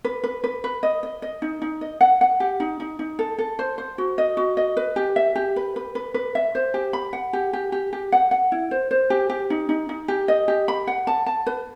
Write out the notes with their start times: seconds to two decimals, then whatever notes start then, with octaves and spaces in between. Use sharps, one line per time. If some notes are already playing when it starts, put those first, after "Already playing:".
0.05 B4
0.24 B4
0.44 B4
0.64 B4
0.83 D#5
1.03 D#5
1.22 D#5
1.42 D#4
1.62 D#4
1.81 D#5
2.01 F#5
2.21 F#5
2.40 G4
2.60 D#4
2.80 D#4
2.99 D#4
3.19 A4
3.38 A4
3.59 C5
3.78 C5
3.98 F#4
4.18 D#5
4.37 F#4
4.57 D#5
4.77 B4
4.96 G4
5.16 E5
5.36 G4
5.56 B4
5.76 B4
5.95 B4
6.14 B4
6.35 E5
6.55 C5
6.74 G4
6.93 B5
7.13 F#5
7.33 G4
7.53 G4
7.72 G4
7.93 G4
8.12 F#5
8.31 F#5
8.52 E4
8.71 C5
8.91 C5
9.10 G4
9.30 G4
9.50 D#4
9.69 D#4
9.89 D#4
10.08 G4
10.28 D#5
10.48 G4
10.68 B5
10.87 F#5
11.07 A5
11.26 A5
11.47 B4